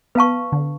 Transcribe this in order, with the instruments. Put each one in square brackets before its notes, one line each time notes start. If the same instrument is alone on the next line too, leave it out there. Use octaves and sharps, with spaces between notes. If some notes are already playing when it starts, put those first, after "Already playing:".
[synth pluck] B3 [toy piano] B4 F5 A5 C#6
[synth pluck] D3